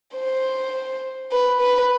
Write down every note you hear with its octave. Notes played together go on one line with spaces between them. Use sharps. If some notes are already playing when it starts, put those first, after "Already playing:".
C5
B4
B4